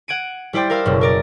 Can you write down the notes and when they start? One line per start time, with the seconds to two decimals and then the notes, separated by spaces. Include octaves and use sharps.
0.08 F#5 G#6 D7 D#7
0.53 G3 E4 C5 D5 G5
0.70 A#4 C5 F5 E6 F6
0.86 F#1 B2
1.01 A#4 D5 A#5